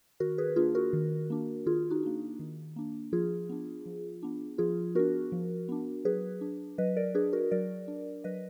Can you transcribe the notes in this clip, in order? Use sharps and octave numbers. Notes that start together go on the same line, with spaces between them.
D#3 F#4 A#4
G#4 B4
A#3 D4 F4 G#4
F#4 A#4
D#3
A#3 D4
D#3 F4 G#4
D#4 F#4
A#3 D4
D#3
A#3 D4
F3 F4 G#4
B3 D4
F3
B3 D4
F3 F4 G#4
B3 D4 F#4 A#4
F3
B3 D4
F#3 G#4 B4
D4
F#3 B4 D#5
A#4 D5
D4 G#4 B4
F#4 A#4
F#3 A#4 D5
D4
F#3 B4 D#5